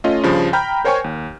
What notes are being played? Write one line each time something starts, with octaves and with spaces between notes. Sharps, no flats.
A3 C#4 F4 D#5
G2 C#3 F3
G5 A#5 B5 F6 G6
A#4 C5 C#5 G5 G#5 C#6
D#2